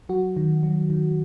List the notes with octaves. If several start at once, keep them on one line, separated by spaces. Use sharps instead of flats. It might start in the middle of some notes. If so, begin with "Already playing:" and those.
F#3 F#4
D#3
F#3
D#3